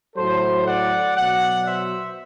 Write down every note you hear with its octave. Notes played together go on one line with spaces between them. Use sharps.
A2 F#3 A4 C5
D5 F#5
B2 F#3 D5 F#5
C5 E5